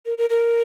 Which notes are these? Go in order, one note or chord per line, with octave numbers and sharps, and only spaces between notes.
A#4
A#4
A#4